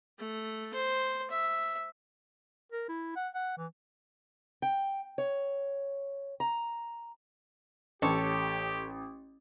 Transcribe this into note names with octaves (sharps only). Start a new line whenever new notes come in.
A3
C5
E5
A#4
E4
F#5
F#5
E3
G5
C#5
A#5
A1 G4 A4 C#5